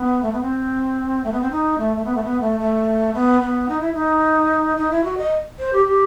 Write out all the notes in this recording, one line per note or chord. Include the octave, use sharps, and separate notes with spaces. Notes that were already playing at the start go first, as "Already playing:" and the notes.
Already playing: B3
A3
B3
C4
A3
B3
C4
D#4
A3
A3
B3
A3
B3
A3
A3
B3
B3
D#4
E4
D#4
D#4
E4
F#4
D#5
C5
G4
G4